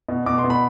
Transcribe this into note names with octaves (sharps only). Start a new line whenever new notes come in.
B2
B2 D6
C6
B2
B5